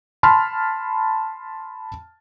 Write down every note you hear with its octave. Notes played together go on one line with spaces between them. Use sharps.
A5 B5 C6 F6